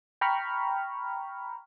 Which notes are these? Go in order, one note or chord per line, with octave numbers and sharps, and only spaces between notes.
G5 A#5 B5 C#6 F6